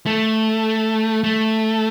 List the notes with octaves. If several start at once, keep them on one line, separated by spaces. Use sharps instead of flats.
A3
A3